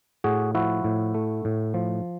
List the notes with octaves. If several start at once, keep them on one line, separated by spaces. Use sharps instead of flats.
A2 F#4 G#4
F3 E4 F#4
A2
A3
A2
F3